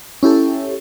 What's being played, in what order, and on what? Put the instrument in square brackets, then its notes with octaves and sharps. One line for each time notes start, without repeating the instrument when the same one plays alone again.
[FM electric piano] C#4 E4 G4 A4